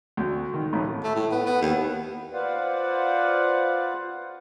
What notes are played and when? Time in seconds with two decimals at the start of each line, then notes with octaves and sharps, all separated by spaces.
0.17 D2
0.54 D#3
0.73 A1
1.03 A3
1.15 A2
1.32 B3
1.46 B3
1.61 D#2
2.33 F4 B4 C5 D5 F5 F#5